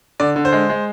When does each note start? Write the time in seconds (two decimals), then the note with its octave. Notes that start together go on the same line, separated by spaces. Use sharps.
0.20 D3 D5
0.36 D3
0.45 C5
0.52 G#3
0.69 G#3